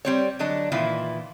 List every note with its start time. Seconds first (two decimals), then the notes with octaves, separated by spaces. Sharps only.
0.05 G3 C4 C#5
0.39 D3 F#3 D4 D#5
0.72 A#2 D#3 E3 E4 F4